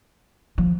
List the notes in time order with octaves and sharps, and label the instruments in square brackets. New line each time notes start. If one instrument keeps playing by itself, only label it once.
[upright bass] F3